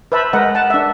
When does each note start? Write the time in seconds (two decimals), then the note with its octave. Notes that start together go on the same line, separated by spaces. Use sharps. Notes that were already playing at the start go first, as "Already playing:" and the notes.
0.12 B4 C5 E5 A5 B5
0.33 G#3 A#4 B4 D#5 F#5
0.55 F#5 A5
0.70 D4 E5